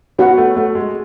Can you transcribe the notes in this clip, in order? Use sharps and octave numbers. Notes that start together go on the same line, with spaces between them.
B3 F#4 C#5 F#5
A3
A3
G#3